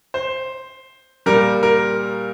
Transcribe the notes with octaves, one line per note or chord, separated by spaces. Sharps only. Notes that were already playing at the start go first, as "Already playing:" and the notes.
C5
A#2 G3 A#4
A#4